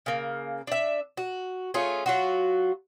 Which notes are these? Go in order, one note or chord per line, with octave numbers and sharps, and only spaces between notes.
C#3 A#3
D4 E5
F#4
A3 C#4 F4 G#4
F#3 F4 F#4